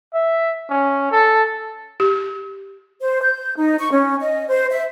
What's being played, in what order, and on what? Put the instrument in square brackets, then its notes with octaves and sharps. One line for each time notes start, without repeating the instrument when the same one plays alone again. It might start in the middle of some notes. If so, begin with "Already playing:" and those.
[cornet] E5
C#4
A4
[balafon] G4
[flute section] C5
G6
D#4
C#6
C#4
D#5
C5
E5